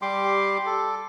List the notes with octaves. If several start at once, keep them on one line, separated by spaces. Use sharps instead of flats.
G3 G4 C6 D6
A4